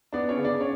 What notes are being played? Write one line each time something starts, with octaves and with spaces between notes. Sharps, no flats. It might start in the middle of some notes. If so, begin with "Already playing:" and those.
B3 D4 D5
C#4 C#5
C#3
D4 D5
C#5